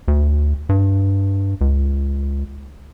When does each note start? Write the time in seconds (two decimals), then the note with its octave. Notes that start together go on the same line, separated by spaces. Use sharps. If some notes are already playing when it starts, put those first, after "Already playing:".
0.08 D2
0.69 G2
1.61 C#2